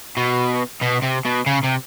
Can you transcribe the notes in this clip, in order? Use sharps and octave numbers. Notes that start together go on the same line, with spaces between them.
B2
B2
C3
B2
C#3
C3